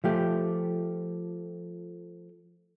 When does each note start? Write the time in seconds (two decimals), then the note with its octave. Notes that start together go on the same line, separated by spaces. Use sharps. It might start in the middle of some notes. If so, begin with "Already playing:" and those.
0.04 F3 A3 G4